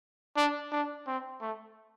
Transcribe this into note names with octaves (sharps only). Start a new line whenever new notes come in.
D4
D4
C4
A3